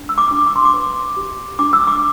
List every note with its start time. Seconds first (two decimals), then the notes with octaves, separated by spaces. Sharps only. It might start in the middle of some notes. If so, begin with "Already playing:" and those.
Already playing: D4
0.09 E6
0.18 D6
0.31 D4
0.46 D6
0.56 C6
0.65 D6
0.74 B4
1.16 G4
1.59 D4 D6
1.73 E6
1.87 D6